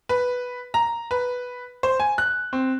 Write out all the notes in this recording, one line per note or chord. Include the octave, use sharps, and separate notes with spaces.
B4
A#5
B4
C5
G#5
F#6
C4